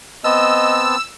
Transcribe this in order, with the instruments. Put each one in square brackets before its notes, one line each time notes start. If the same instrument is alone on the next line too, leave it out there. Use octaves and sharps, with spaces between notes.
[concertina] B3 C4 A5 [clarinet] D#5 [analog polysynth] E6